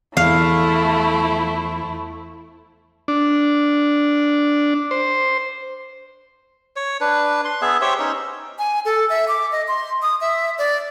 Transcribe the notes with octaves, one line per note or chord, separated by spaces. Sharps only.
E2 F3 A3 E4 F5
D4
C5
C#5
D4 B4
C6
B3 G#4 E5
G4 C5 C#5 E5
C#4 D#4
G#5
A4
E5
D6
D#5
C6
D#6
E5
D5